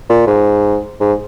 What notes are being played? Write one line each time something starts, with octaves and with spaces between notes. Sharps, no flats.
A#2
G#2
G#2